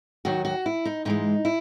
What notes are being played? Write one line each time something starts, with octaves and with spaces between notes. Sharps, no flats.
D#2 D#3 F#3 F#4
F#4
E4
D#4
G#2 E3 G#3 D#4
E4